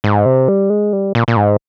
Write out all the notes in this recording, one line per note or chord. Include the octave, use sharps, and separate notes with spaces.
G#2
C3
G3
G#3
G3
A#2
A#2
G#2